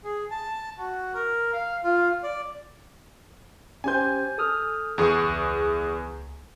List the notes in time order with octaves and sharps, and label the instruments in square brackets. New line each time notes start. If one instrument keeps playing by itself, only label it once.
[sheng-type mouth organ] G#4
A5
F#4
A#4
F5
F4
D5
[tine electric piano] C#4 G4 C5 [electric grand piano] G#5 G6
[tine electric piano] A4 D#6 F6
[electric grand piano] E2 G#4 C#6
[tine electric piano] C#2